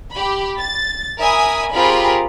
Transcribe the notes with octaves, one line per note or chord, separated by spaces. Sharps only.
G4 B5
A6
A#4 E5 G#5 B5 D#6
C4 F4 G4 G#4 A#4 B5